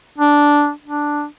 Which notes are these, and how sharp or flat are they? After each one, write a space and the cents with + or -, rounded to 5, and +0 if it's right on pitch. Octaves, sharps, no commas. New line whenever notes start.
D4 -5
D4 +0